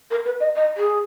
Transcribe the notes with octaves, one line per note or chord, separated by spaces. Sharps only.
A#4
B4
D#5
D#5
G#4